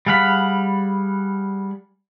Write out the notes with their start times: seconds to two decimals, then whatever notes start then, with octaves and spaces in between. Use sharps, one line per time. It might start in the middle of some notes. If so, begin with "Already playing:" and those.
0.06 G3 G#4 F5 F#5 B5